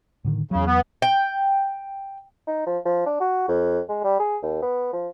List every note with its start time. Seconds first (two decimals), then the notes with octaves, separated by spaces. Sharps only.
0.25 A2 D3 D#3
0.51 E2 C#3 F#3
0.67 B3
1.02 G5
2.47 D#4
2.66 F3
2.85 F3
3.06 D4
3.20 F#4
3.48 F2
3.89 G#3
4.04 G3
4.20 G#4
4.43 D#2
4.62 B3
4.93 F3